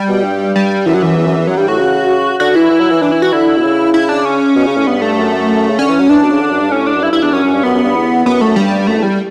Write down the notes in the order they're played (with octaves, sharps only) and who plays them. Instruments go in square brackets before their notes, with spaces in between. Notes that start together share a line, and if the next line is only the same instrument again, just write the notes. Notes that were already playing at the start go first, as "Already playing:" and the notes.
Already playing: [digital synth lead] G3
[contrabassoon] B2
G2
[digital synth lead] G3
[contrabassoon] F#2 [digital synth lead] E3
[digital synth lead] F#3
E3
[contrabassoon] E2
F#2
E2
[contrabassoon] F#2 [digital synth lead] F#3
[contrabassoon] G2 [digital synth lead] G3
[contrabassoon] A2 [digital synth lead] F#4
[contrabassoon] C#3
[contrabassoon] D3 [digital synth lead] F#4
[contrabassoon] E3 [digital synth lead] E4
[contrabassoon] E3
F#3
E3
[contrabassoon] E3 [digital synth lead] D4
[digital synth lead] E4
F#4
[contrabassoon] D3 [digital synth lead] E4
[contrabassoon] B2
C#3
[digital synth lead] E4
D4
C#4
[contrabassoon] B2
C#3
A2
[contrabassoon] G2 [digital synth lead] B3
[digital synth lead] A3
[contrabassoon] F#2
C#3
[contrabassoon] D3 [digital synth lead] C#4
[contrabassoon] E3
F#3
[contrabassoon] E3 [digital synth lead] D4
[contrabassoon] B2
C#3
D3
F#2
G2
[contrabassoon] A2 [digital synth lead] C#4
[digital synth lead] D4
[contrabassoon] F#2
[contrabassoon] G2 [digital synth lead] E4
[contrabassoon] G2 [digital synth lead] E4
[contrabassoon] E2 [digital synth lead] D4
[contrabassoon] F#2 [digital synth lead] C#4
[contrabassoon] F#2
G2
[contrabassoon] F#2 [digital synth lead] B3
[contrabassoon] F#2
G2
E2
[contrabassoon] F#2 [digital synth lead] B3
[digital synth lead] A3
[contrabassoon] F#2
[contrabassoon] G2 [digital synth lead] G3
[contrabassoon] F#2 [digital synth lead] A3
[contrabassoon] E2
[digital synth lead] G3